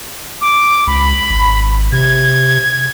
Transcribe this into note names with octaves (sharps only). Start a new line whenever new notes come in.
D6
C#2 B5
G#1
C3 G#6